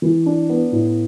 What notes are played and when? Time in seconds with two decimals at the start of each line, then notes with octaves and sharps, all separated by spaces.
0.02 E3
0.26 D4
0.49 B3
0.72 A2